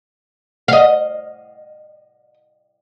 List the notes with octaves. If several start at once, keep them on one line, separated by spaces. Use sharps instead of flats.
D#5 F5